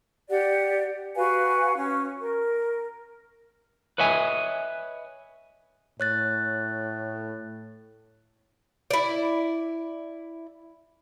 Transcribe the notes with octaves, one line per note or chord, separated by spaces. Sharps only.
G4 D5 F#5
F#4 B4 F5 G#5
C#4
A#4
B4 C#5 D#5 E5 G#5
A2 C#5 F#6 A6
E4 D5